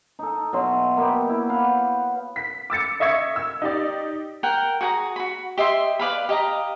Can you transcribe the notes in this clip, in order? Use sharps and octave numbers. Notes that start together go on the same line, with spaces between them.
D#4 A4
B2 F#3 E5 C6
A#3 B3 G4
E4
B4 F5 F#5
B6
D6 E6 A6 C#7
D#5 E5 C#6 G#6 C#7
E6
D#4 G4 D5
A#4 F#5 G5
F#4 G#4 G5 A#5
F#4 B5
G4 D#5 E5 C6
B4 D5 F5 B5
G4 D#5 F5 A#5